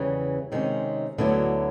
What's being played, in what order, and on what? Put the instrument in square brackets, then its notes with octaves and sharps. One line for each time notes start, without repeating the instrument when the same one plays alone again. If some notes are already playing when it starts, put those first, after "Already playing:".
Already playing: [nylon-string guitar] E2 C#3 E3 G3
C3 D#3 G#3 C#4
D2 D3 F#3 B3 E4